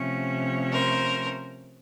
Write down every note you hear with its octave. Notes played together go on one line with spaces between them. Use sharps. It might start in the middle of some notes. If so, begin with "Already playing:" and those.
Already playing: C3 F3 A3 C#4
A#4 C5